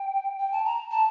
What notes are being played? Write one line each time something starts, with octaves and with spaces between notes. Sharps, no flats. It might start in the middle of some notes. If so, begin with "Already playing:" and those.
Already playing: G5
G5
A5
A#5
A5